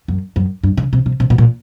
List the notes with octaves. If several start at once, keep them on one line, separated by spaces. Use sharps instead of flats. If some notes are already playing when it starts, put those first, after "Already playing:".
F#2
F#2
G2
C#3
C3
C3
C3
B2
A#2